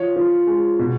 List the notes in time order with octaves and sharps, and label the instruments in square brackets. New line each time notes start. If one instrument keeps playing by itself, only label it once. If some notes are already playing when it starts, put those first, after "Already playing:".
Already playing: [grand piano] F3 C#5
F3
G#3
B2